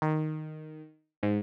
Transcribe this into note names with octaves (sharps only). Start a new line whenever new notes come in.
D#3
G#2